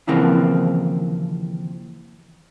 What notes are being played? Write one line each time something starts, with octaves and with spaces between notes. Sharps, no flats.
D#2 C#3 E3 F3 A#3 C4